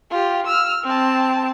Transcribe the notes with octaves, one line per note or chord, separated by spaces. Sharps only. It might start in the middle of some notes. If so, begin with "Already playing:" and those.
F4 G4
E6 F6
C4 A5